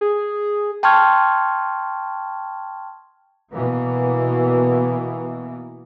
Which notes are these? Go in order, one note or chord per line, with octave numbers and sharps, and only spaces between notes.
G#4
G5 A5 C6 C#6 F6 G#6
B2 E3 A#3 B3